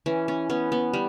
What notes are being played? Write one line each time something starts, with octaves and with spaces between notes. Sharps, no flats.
E3 C#4
C#4
B3 C#4
B3
G3